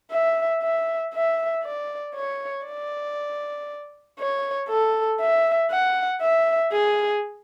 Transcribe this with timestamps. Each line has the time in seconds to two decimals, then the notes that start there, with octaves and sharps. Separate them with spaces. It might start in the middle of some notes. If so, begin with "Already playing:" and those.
0.11 E5
0.62 E5
1.14 E5
1.64 D5
2.15 C#5
2.66 D5
4.19 C#5
4.69 A4
5.20 E5
5.71 F#5
6.21 E5
6.72 G#4